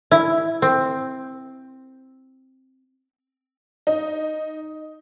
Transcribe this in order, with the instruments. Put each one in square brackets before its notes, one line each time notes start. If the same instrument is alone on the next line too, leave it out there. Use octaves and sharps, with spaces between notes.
[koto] E4
C4
[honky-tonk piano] D#4